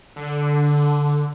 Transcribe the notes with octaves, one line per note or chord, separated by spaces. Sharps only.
D3